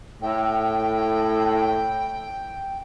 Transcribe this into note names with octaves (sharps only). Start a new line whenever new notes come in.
A2 G5